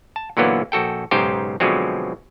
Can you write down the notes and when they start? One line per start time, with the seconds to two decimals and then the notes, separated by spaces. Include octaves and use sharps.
0.16 A5
0.37 A#2 D3 E3 F#3 A#3 B3
0.72 A#1 F#4 A4 G5
1.11 B1 G#2 C#3 D#4 G4 C5
1.60 B2 D3 F3 F#3 G#3 C4